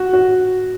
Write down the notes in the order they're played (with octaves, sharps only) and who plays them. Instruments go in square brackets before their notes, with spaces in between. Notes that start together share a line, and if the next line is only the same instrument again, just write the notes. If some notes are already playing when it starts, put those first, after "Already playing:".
Already playing: [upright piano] F#4
F#4